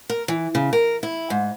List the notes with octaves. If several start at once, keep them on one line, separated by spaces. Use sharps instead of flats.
A#4
E3
C#3
A#4
E4
G#2